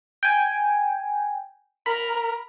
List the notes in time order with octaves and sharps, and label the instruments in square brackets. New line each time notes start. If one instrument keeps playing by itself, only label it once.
[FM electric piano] G5 G#5
[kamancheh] A#4 [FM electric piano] B5